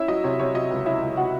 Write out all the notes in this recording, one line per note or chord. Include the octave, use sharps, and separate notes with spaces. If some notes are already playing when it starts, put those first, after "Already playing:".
Already playing: C#4 E4 E5
F#3 D#5
C3 C#5
C3 C#5
F#3 D#5
C#2
C#4 E4 E5
C#2
C3 F#4 F#5